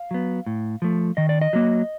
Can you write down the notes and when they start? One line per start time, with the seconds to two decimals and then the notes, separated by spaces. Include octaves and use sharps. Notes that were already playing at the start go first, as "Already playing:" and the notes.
Already playing: F5
0.11 F#3 B3
0.46 A2
0.82 F3 A3
1.17 D#3 D#5
1.29 D5
1.41 D#5
1.53 F#3 A#3